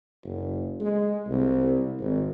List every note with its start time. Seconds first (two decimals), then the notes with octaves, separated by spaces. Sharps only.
0.24 F#1
0.81 G#3
1.28 C2
2.00 G#1